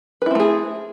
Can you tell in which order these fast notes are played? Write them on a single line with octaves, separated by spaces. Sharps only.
B4 E4 C4 A3 G#4